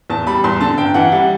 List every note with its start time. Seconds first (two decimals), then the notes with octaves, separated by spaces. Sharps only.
0.10 E2 A5
0.27 G3 B5
0.44 E2 C6
0.61 D3 A5
0.78 G1 G5
0.94 E3 F#5
1.12 G3 F#5